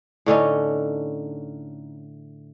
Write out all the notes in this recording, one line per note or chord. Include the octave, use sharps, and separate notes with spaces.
A2 D3 C#4 D#4